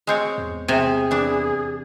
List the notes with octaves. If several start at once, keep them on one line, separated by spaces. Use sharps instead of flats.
G#3 C4 C#5
E2
C3 G#4
E3 D4